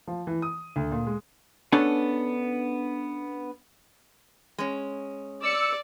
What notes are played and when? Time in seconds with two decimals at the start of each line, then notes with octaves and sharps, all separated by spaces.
0.08 F3
0.27 E3
0.42 D#6
0.76 D2
0.91 A#2
1.07 G#3
1.72 B3 C#4 D4 A4 B4 C#5
4.58 G#3 C#4
5.42 D5 E6 C#7